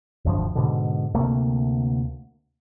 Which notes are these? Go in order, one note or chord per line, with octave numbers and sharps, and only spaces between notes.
E1 D2 G2 F3
G#2 B2 D3
D2 C3 A3 A#3